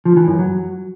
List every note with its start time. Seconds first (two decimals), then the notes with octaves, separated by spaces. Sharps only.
0.05 F3
0.17 E3
0.28 F#2
0.39 F#3